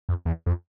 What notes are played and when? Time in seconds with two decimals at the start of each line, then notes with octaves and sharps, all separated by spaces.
0.09 F2
0.26 E2
0.46 F2